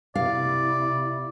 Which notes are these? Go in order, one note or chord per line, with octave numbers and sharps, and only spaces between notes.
C3 E4 D5 F5